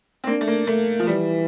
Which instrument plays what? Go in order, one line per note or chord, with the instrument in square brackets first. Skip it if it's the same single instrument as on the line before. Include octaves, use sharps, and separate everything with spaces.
[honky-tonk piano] C4
[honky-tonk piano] A#3 [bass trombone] D4
[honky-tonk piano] A3
A#3
[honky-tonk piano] A3 [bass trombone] A#3
[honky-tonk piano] F3
[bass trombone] E3 [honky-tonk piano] G3